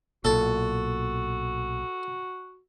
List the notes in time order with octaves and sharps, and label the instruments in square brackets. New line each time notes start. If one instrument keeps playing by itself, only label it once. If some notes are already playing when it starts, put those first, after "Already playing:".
[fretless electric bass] B1 A#2 [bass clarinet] F#4 [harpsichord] A4